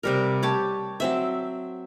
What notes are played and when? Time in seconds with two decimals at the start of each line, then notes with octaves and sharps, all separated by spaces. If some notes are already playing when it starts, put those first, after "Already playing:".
0.03 C3 G3 A#4
0.43 G4 C#5 A5
1.00 F#3 C4 E5